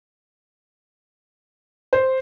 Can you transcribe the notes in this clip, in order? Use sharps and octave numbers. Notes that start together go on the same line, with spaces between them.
C5